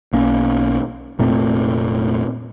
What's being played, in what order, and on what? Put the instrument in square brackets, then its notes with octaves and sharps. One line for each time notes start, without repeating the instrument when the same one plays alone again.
[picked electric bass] B1 A#3 C#4
F1 A#2 A3 C4